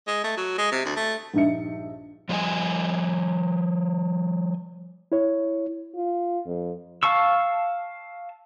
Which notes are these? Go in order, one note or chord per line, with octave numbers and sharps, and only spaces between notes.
G#3
A3
F#3
G#3
C3
D2
A3
A#1 G2 D#4 E5 C#7
F3 G3 D#5 E5 G#5
E4 C#5
F4
F2
F5 A5 C#6 E6